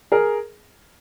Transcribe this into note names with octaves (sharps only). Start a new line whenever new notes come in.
G#4 A#4